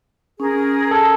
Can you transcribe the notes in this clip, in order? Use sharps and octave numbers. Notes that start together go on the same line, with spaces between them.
C#4 G#4 A#4
A4